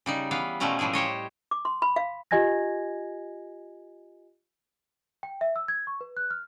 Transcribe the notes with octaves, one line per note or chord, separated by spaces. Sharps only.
C#3 G3 D#4
E3 B3 F5
B2 F3 G3 A3 C#4 A#5
A2 E3 F3 G3 G#4
G4 C5 C#5 D#5
D6
C6
B5
F5
F4 G4 D#5 G#5 G#6 A#6
G5
E5
E6
G#6
C#6
B4
F#6
F6